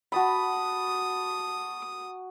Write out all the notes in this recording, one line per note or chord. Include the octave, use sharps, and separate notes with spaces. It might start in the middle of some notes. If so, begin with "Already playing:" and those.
F#4 A5 B5 D#6